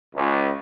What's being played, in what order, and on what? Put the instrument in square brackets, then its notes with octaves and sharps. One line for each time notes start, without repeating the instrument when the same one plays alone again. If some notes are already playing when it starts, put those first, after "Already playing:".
[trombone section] C#2